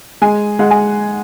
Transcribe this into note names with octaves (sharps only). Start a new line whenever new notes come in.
G#3 G#5
G#3 F#5
G#5